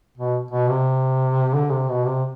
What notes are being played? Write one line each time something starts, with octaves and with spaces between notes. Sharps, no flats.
B2
B2
C3
D3
C3
B2
C3